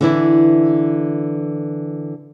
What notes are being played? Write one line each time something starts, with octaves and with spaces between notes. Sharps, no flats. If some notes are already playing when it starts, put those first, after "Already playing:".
D3 E3 E4